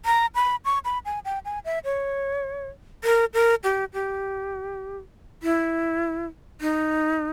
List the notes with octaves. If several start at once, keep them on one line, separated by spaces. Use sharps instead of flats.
A#5
B5
C#6
B5
G#5
G5
G#5
E5
C#5
A#4
A#4
G4
G4
E4
D#4